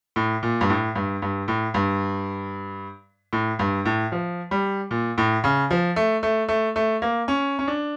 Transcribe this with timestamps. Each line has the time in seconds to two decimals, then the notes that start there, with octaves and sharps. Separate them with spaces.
0.16 A2
0.43 A#2
0.61 G2
0.70 A2
0.95 G2
1.22 G2
1.48 A2
1.74 G2
3.33 A2
3.59 G2
3.85 A2
4.12 F3
4.51 G3
4.91 A#2
5.18 A2
5.44 C#3
5.71 F3
5.96 A3
6.23 A3
6.49 A3
6.76 A3
7.02 A#3
7.28 C#4
7.59 C#4
7.68 D4